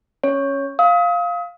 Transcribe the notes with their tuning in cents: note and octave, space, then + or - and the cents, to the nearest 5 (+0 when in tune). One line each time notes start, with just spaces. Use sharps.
C#4 -10 C#5 +0
F5 +5 D#6 +40